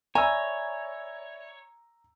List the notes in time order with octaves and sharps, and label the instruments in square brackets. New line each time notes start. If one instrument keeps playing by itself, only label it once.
[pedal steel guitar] C#5 [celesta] D5 E5 B5 [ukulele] G#5 [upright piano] A#5 E6